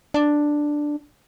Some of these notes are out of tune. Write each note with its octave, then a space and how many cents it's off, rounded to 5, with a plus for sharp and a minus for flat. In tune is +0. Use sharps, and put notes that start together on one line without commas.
D4 +5